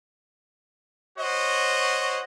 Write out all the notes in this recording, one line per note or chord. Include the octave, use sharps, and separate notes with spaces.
F#4 C5 C#5 D#5